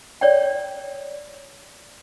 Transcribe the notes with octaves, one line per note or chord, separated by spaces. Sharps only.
C#5 D5 G5